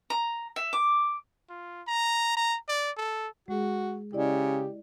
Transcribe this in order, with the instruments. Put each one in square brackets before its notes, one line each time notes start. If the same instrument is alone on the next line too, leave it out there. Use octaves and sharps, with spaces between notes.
[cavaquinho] A#5
E5
D6
[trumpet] F4
A#5
A#5
D5
A4
[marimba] G#3 G#4 [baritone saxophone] F#4
[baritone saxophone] C#3 [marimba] E4 D5 D#5 [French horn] G4